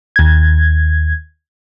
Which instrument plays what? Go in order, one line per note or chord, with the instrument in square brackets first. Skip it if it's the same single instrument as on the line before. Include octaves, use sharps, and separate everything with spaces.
[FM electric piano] D#2 G#6